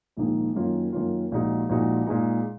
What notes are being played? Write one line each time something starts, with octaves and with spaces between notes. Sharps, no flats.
A#1 G#2 D#3 A#3 D#4
F#2 D#3 A#3 C#4 F4
F#2 D#3 A#3 C#4 F4
A#1 A#2 G#3 D#4 F#4
A#1 A#2 G#3 D#4 F#4
A#2 G#3 D#4